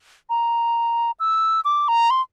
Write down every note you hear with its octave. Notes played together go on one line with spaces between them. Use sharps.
A#5
E6
D6
A#5
C6